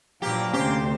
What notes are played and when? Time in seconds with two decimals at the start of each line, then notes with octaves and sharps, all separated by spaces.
0.22 G2 A#2 F3 F#3 A#3 G4
0.53 D2 C3 C#4 G4 C5